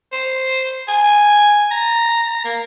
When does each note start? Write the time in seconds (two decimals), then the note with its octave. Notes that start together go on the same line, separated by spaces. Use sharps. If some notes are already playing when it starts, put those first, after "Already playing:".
0.12 C5
0.88 G#5
1.71 A#5
2.45 A#3